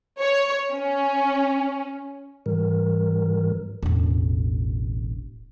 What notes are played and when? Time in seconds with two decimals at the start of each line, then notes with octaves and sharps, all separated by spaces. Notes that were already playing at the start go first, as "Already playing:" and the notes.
0.20 C#5
0.73 C#4
2.46 G#2 E3 G3 A#4
3.83 E1 A1